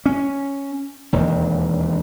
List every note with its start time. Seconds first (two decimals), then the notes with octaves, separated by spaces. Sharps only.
0.06 C#4
1.13 E1 D#2